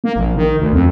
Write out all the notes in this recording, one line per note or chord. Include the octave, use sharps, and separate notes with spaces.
A#3
A#1
D#3
D2
F2